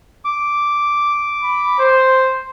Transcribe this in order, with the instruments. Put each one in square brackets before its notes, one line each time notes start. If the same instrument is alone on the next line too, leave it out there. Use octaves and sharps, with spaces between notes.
[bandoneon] D6
[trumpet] B5
C5